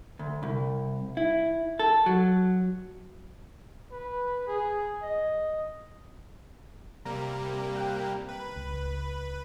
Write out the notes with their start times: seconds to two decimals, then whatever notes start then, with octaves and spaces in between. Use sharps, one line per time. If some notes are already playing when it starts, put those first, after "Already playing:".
0.19 D2
0.43 C2
1.17 E4
1.79 A4
2.06 F#3
3.92 B4
4.47 G#4
5.02 D#5
7.05 C3 G3 A#3 A#5
7.76 G5 A#5 F#6
8.29 B4
8.56 C#2